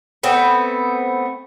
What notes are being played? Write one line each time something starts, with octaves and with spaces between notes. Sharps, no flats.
A3 B3 C4